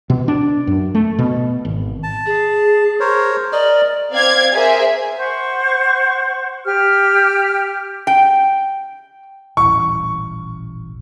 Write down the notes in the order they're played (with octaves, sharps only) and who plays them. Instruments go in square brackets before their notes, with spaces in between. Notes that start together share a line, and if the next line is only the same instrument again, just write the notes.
[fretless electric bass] B2
D4
F#2
A3
B2
G#1
[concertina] A5
[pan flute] G#4
[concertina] A#4 C5 C#5
[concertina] A#4 D#5 [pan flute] D5
[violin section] C4 D5 F5 G#6
G#4 A#4 C5 E5
[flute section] C5 F#5 C#6
G4 F6
[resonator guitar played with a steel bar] G5
[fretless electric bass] D#1 A1 [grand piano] C#6